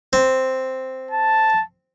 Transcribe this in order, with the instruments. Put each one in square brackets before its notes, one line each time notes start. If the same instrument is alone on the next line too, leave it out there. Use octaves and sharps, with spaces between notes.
[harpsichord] C4
[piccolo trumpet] A5